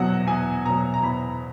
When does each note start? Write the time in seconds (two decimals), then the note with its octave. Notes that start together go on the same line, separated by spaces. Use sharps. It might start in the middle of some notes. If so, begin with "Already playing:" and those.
Already playing: E2 B2 F#3 F#5
0.27 E2 G#5
0.65 B2 F#3 A#5
0.94 A#5
1.03 E2 B5